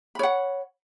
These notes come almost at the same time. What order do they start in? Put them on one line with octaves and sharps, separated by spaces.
B5 C#5 F#5